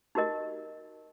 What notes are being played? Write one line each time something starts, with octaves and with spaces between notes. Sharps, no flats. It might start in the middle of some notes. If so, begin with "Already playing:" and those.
D#4 F#4 G4 A#4 D#5